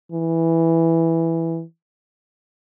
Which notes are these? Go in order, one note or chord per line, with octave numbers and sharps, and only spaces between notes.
E3